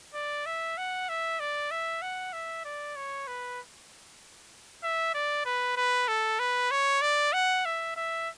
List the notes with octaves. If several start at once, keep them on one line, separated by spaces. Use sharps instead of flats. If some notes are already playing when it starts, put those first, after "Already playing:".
D5
E5
F#5
E5
D5
E5
F#5
E5
D5
C#5
B4
E5
D5
B4
B4
A4
B4
C#5
D5
F#5
E5
E5